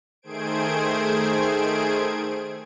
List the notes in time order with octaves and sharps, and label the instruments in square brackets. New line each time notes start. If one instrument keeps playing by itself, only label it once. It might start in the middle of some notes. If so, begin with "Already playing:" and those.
[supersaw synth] D#3 A3 G#4 C5 G#6 D7